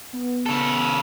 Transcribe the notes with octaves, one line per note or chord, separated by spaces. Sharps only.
B3
C#3 A4